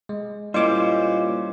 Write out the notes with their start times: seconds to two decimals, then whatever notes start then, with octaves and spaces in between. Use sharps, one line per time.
0.09 G#3
0.54 A#2 G3 C#4 E4 C5 D#5 C6 D6